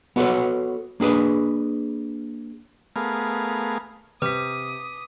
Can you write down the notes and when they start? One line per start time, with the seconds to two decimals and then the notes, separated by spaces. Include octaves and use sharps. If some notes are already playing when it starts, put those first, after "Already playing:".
0.16 B3 F#4 A4 B4 C#5
1.00 A#3 D4 G#4 B4
2.96 A3 B3 G#4 A#4 F5
4.22 C3 B4 D6 D#6 B6